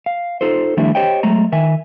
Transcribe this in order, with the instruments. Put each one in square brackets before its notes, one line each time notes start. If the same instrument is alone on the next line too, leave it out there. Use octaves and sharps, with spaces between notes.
[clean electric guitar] F5
D#4 F4 A4 C5
D#3 F3 G3 A3 D4 E4
G4 C5 C#5 D#5 G5
F#3 G#3 A3 A#5
D#3 E5 G#5